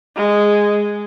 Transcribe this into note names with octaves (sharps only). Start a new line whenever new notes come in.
G#3